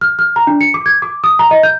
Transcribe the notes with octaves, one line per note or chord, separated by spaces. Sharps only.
F6
F6
A#5
D4
C#7
D6
G#6
D6
D#6
A#5
D#5
G6